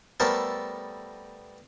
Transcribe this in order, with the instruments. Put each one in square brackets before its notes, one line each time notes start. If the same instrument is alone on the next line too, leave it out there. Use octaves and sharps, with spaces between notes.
[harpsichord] G3 A3 B3 A4 A#4 C5